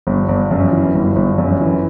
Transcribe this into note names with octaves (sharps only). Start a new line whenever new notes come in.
G1
G1
F#2
E3
G1
G1
F#2
E3